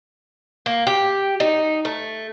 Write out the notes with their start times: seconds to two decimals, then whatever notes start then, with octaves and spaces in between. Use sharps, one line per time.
0.66 A#3
0.87 G4
1.40 D#4
1.85 A3